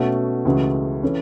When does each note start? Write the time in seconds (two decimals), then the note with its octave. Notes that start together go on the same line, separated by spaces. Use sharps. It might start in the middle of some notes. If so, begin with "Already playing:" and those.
Already playing: B2 A3 C#4 F#4
0.45 C#2 C#3 E3 A3 F#4
1.03 E3 C#4 A4